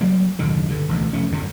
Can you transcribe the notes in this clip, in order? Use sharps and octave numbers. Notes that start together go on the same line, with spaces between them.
F#3 G3 A#3
F#1 D#2 B2 D3
G2 D3
E1 A1 D2
F1 A3 C#4
G1 F#2 A2